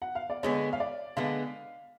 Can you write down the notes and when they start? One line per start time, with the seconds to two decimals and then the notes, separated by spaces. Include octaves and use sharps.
0.02 F#5
0.15 F5
0.30 D5
0.43 D3 G#3 B3 C#5
0.73 F5
0.80 D5
1.16 D3 G#3 B3 F5